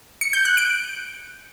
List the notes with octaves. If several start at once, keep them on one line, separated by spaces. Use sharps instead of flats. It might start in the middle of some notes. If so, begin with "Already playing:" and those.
C#7
G6
F#6
D7